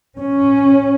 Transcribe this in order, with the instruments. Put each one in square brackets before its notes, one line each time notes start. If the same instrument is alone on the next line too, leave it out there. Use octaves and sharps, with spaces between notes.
[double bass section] C#4